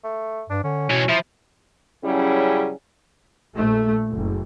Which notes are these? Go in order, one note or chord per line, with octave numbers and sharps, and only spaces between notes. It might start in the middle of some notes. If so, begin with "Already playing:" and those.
A3
G2 D4
D3 C#4
B2 E3 C#5
F3 E4
C#3 F#3 G3 C#4 E4 G#4
A#1 A3
F#1